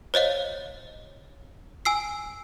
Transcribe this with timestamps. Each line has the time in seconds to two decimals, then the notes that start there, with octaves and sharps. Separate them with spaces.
0.14 C5 C#5 D#5 F5
1.85 G#5 E6 C7